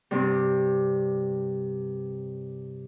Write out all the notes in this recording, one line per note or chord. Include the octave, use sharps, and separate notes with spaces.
G2 C3 G3